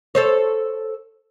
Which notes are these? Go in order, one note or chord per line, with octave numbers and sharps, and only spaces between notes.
A4 C5 C#5